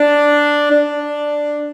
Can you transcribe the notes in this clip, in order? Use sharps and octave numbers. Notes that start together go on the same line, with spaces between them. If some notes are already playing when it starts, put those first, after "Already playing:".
Already playing: D4
D4